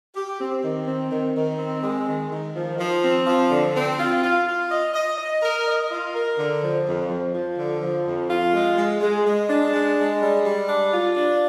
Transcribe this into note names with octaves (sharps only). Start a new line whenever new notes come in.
G4
C4
D#3
C4
D#3
D#3
C4
G#3
D#3
D#3
F3
F3
C4
F3
D3
C4
F4
F4
F4
D#5
D#5
D#5
A#4
D#5
F4
A#4
D3
F3
F2
F3
F3
D3
F3
F2
F4
G#3
G#3
G#3
G#3
D4
G#3
G#3
G3
G3
D4
F4
D4